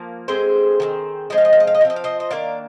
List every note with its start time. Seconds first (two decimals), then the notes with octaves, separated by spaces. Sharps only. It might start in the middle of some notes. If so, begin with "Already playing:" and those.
Already playing: F3 A#3
0.28 D3 G#3 C4 G#4 C5
0.80 D#3 G#3 C4
1.30 F3 G#3 C4 D#5
1.38 F5
1.45 D#5
1.53 F5
1.60 D#5
1.67 F5
1.75 D#5
1.81 F3 F5
1.85 C4
1.90 D#5
1.96 F5
2.04 C5 D#5
2.20 D#5
2.31 D#3 A#3 D4 D5 F5